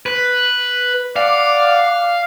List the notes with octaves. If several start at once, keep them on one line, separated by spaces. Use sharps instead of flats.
B4
D5 F5 F#5 D6